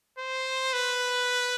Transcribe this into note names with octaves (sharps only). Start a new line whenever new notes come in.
C5
B4